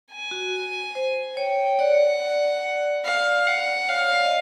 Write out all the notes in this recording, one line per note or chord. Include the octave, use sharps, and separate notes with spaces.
G#5
F#4
C5
C#5 G5
D5 F#5
F5
F#5
C#5 F5
D5
D#5